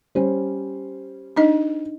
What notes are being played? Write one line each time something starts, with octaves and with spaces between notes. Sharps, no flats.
G3 C#4 C5
D4 D#4 D#5